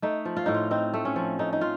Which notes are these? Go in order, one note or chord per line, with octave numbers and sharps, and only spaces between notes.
A3 D#4
F3
F4
A2 D#4
F4
C4 D#4
A3
C#4
F3
A3 D#4
D#4
F4